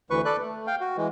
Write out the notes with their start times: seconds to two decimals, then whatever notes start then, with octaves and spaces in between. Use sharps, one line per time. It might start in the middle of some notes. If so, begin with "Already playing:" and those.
0.10 D2 E3 B4 C#6
0.25 A4 B4 D5 F#6
0.40 A3
0.67 F5 G5
0.81 F#4
0.97 E3 G#3